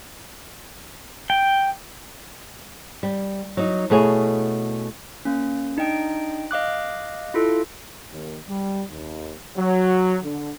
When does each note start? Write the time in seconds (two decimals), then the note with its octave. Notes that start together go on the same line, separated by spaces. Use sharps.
1.30 G5
3.03 G3
3.57 F#3 D#4
3.90 B2 A3 E4 G#4 C#5 G#5
5.25 A#3 C#4
5.77 D4 D#4 D#5 G5 D7
6.51 D#5 F5 D6 F#6
7.34 E4 F4 A4
8.10 D#2
8.48 G3
8.89 D#2
9.57 F#3
10.23 D3